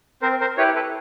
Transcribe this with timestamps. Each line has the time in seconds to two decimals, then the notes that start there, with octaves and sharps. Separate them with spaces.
0.22 C4 A#4 C5
0.40 A#4 C5
0.57 E4 G4 B4 C#5
0.75 A4 B4